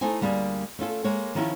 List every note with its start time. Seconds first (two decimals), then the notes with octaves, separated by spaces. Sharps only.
0.01 A3 D#4 E4 C5 G#5
0.21 D2 G3 A#3 D4 F4 G#4
0.79 A3 C#4 F4 A4
1.04 G#3 A#3 C#5
1.35 D#3 F3 C#4 E4 F4 G4